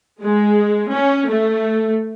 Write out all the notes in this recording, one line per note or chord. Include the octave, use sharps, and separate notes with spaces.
G#3
C#4
A3